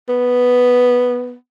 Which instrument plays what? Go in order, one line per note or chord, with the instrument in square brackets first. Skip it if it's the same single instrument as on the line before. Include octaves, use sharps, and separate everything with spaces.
[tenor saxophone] B3